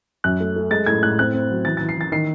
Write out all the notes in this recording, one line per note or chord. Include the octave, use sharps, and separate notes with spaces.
F#2 F#6
A3
A3
G#3 A6
A2 G#6
A2 F#6
C4 F#6
C4
F#3
E3 A6
A6
E3
C7
E3 A6
D#3 C7